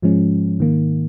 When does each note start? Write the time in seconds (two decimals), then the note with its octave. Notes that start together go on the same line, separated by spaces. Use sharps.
0.02 G#2 F3 G#3 C#4
0.60 G#2 D#3 A#3